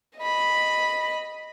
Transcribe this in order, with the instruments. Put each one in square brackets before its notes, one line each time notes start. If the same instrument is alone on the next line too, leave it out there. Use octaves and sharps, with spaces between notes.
[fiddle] D#5 B5